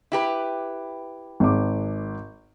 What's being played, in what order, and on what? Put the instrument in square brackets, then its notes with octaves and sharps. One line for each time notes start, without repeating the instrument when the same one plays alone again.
[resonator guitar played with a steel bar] E4 G4 B4
[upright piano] G#1 D6